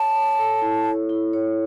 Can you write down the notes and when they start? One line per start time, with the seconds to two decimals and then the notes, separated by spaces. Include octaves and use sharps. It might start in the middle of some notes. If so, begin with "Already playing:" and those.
Already playing: C#5 A5
0.16 C#5
0.39 A4
0.62 E4
0.85 C#5
1.09 E4
1.33 C#5